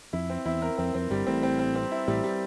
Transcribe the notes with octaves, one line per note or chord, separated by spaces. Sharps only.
F2 E4
C4
E2 E4
A#4
F2 C4
F2 C4
G1 G2 G3
A1 A2 C4
C4
C4
C4
E4
A1 A2 G3
G3